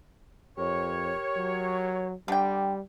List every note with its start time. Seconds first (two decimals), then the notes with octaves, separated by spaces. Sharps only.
0.58 F2 G4 A#4 C#5
1.36 F#3
2.28 D3 G3 G5